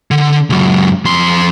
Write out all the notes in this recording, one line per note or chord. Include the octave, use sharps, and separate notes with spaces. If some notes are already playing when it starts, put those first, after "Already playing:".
D3
C#2 F#2
F2 C6